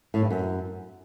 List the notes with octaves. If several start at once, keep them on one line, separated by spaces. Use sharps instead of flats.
A2
G2
F#2